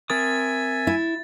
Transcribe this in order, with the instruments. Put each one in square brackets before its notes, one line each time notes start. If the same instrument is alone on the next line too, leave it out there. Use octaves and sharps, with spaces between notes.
[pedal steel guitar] C4 A#4 D#6 [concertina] E5 G#5 [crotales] A6
[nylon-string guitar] E4